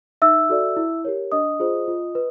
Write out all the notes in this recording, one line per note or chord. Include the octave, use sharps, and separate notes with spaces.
D#4 E5 E6
F#4 A4 D5
E4
G4 A#4 C#5
D4 D#5 D#6
F4 G#4 C5
F4
B4